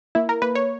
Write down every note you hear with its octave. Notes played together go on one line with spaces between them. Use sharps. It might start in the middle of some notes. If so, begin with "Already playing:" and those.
A#3 E4
A#4
A#3 B4
C#5